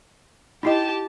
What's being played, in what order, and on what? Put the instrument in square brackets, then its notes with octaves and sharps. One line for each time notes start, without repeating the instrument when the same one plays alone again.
[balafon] D#4 E4 D#5 [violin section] G4 A5